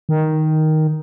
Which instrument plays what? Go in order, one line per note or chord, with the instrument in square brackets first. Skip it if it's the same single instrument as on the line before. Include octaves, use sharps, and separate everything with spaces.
[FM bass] D#3